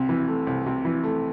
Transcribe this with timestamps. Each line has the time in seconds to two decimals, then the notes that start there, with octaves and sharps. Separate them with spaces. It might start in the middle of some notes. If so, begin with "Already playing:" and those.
Already playing: C2 C3
0.09 E3
0.28 A3
0.47 C2
0.66 C3
0.85 E3
1.04 A3